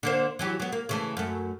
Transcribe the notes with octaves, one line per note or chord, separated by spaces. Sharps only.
D3 A#3 C5
E3 F#3 G4
F#3 B3
A#3
C#3 E3 A3
F#2 A3